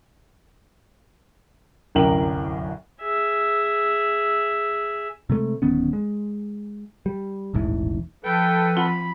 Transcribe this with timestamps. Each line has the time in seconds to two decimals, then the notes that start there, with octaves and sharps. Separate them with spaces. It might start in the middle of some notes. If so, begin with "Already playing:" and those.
1.95 D1 C2 F#2 A#4 G5 F#7
3.01 G#4 E5
5.30 C3 G#3 A3
5.62 D1 D#3 B3 C#4
5.93 G#3
7.06 G3
7.54 D#1 A1 G#2 E3
8.24 F3 A4 B4 G5
8.76 C4 F4 F#5 B5